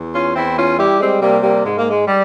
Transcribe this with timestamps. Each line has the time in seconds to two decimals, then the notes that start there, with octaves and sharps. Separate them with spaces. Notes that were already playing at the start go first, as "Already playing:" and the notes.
Already playing: E2
0.14 C#4 F4
0.36 E2 C4 E4
0.58 C#4 F4
0.79 G3 E4 G4
1.00 G#3 C4
1.22 C3 G3 A#3
1.43 G3 A#3
1.65 G#2 G#3
1.77 A#3
1.90 G#3
2.08 G3